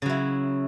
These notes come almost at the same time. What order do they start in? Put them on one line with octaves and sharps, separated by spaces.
C#3 F#3 E4